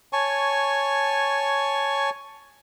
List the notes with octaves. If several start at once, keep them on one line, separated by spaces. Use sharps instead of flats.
C#5 G#5 A5 C#6